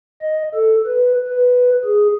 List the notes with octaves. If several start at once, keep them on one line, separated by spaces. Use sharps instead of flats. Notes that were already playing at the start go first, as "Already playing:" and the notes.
D#5
A4
B4
B4
G#4